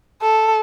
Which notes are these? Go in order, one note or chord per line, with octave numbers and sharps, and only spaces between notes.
A4